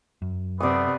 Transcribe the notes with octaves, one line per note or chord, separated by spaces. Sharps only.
F#2
C3 A3 B3 D5 D#6